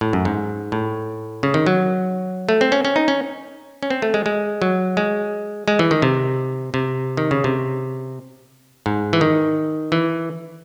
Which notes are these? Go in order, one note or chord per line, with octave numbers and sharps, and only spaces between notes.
A2
F#2
G#2
A2
C#3
D#3
F#3
A3
C4
C#4
C#4
D#4
C#4
C#4
C4
A3
G#3
G#3
F#3
G#3
G#3
E3
D#3
C3
C3
D#3
C#3
C3
G#2
E3
D#3
E3